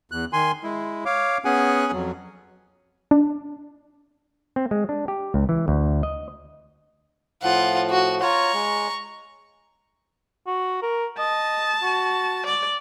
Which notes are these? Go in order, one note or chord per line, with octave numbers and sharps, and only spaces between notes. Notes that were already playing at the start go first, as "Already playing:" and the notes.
E2 F#6
D#3 G#5 C6
G#3 E4
C#5 F5 D6
B3 C#4 G#4 F#5 G#5
F2 F#3
D4
C4
G#3
D4
G4
C#2
E3
D2
D#5
A2 F3 F4 F#5
F#4
F4 C#5 A#5 C#6
G#3
F#4
A#4
D#5 A5
F#4
D5